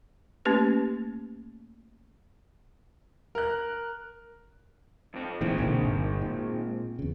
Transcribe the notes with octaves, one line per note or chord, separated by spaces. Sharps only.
A3 A#3 C#4 G4 B4
A#4 F#6
F2 C4
A#2 D#3 E3 G#3 C4
B1 A#2 D3
G1
A#2
E2 C#3